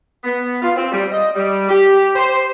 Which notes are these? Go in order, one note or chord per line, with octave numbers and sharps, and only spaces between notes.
B3
F4
C4
G3
D#5
G3
G4
C5